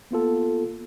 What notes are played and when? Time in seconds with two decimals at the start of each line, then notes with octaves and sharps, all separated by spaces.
0.11 A#3 B3 F4 A4